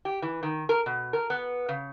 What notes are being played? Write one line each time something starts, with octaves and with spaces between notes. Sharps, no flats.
G4
E3
D#3
A#4
B2
A#4
B3
C#3